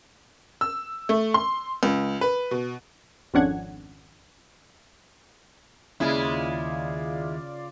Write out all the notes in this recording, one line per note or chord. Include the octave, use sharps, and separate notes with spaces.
E6
A3
C6
C#2
B4
B2
G#1 F2 C#4 D4 F#5 G#6
D#2 C#3 G#3 E4 F4 D5 F5